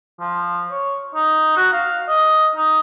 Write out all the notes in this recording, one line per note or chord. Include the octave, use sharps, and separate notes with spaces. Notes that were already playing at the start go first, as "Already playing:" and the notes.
F3
C#5
D#4
F#4
F5
D#5
D#4